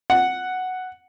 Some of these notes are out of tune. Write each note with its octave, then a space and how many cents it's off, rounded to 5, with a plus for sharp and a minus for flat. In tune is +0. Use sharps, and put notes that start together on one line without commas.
F#5 +0